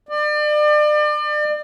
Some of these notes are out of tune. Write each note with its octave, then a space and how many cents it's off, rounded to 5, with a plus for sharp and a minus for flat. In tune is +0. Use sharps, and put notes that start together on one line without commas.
D5 +35